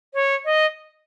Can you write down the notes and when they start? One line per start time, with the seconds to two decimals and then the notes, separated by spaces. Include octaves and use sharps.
0.14 C#5
0.45 D#5